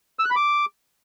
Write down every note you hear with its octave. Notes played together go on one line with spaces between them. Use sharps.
E6
F#6
B5
D6